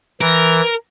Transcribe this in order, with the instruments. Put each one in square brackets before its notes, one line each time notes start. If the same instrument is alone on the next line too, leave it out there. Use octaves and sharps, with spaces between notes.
[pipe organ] E3 [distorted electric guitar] A#4